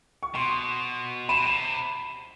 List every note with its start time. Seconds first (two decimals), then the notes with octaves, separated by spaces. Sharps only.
0.23 C#6
0.34 B2 C6
1.29 C3 B5
1.38 B2
1.46 C3